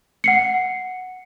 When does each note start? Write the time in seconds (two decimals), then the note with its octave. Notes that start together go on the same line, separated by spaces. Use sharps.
0.24 F#5 C7 C#7